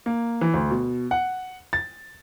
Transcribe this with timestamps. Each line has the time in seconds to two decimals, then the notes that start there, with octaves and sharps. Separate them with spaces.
0.06 A#3
0.41 E3
0.54 D2
0.71 B2
1.11 F#5
1.73 A6